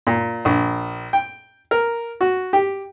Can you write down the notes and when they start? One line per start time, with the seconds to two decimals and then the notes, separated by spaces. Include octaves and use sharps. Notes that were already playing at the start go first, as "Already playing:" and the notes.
0.07 A#2
0.45 A#1
1.13 G5
1.71 A#4
2.21 F#4
2.53 G4